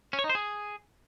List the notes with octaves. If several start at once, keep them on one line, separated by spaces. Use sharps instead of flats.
C#4
C#5
D#4
C5
G#4